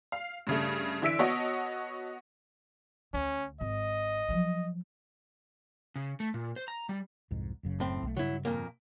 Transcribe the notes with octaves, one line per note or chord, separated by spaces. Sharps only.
F5
G2 C#3 A3
D3 E3 E5 E6 B6 D7
B3 F#4 C#5 D#5 F#5 A5
D2 C#4
G#1 D#5
F3 F#3
C#3
A3
A#2
C5
A#5
G3
C2 F2 G#2
F#1 F#2 C#3
A2 C4
B1 D#3 A3
G2 C#3 F#3 E4
F2 A#2 A#3